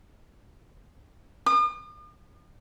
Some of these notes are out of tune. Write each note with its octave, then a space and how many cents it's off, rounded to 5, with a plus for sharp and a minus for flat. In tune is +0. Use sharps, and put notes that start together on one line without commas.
D#6 -45